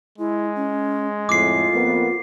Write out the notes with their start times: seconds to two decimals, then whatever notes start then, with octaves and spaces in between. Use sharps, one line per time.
0.18 G#3 E4
0.55 C#4
1.29 F2 A2 F4 D6 C7
1.74 F2 A#3 B3